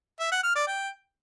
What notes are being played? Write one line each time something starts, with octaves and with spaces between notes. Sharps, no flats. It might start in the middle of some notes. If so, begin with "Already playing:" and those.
E5
F#5
F6
D5
G5